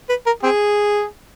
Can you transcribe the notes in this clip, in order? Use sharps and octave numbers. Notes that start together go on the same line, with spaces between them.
B4
A#4
C4 G#4